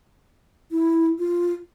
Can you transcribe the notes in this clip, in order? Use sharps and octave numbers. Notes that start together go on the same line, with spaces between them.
E4
F4